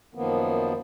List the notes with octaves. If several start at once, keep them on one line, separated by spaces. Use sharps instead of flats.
F#2 D#3 F3 A#3 B3